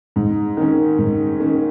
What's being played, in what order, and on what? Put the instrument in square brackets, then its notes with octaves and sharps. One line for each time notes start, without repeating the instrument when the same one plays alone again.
[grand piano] G#2
D#3 A#3 C#4
G#2
D#3 A#3 C#4